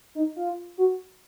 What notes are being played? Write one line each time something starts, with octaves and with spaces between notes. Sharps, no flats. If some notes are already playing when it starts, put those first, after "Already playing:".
D#4
F4
F#4